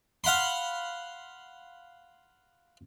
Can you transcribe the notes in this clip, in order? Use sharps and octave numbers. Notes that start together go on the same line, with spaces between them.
F5 F#5 B5 C6